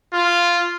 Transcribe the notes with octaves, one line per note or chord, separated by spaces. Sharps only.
F4